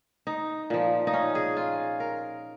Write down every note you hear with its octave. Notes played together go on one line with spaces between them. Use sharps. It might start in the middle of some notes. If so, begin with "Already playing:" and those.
D#4
A#2 F3
D#4
C#4
G#4
F4
A#4